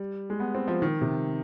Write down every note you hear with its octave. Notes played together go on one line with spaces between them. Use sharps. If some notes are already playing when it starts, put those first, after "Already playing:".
Already playing: G3
G#3
B3
C4
F3
D#3
C3